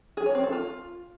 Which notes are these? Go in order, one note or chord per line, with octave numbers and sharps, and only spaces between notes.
G#4
C#5
C4
A4
F4